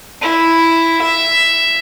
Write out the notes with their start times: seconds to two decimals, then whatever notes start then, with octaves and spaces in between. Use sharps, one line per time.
0.22 E4
1.02 E5